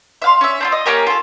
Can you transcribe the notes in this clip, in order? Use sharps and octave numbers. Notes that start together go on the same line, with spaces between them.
E5 F5 C6
C#4 E5
C4 D4 F4
D#5
A#3 C#4 G4 A#4
F4 A4